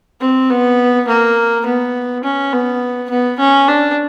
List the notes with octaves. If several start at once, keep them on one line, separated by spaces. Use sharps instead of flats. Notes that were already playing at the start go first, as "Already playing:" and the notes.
C4
B3
A#3
B3
C#4
B3
B3
C#4
D4